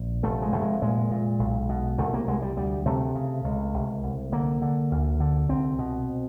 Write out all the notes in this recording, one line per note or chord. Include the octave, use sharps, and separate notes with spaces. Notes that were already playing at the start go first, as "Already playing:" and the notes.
Already playing: A#1
F1 A3
G#3
F1 A3
G#3
A#2 G#3
A#2
B1
B2
C2 A3
A#3
C2 G#3
G3
D2 G3
C3 A3
C#3
C#2
C2
C2
D3 A#3
D3
D2
D3
C2 C4
B2